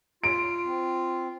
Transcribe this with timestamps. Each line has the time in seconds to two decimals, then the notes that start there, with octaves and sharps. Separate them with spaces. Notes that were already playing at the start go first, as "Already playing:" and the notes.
0.24 F4 D7
0.65 C4